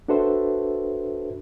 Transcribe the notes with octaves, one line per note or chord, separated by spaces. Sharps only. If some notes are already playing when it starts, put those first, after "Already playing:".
D4 F#4 A4 B4 C5 E5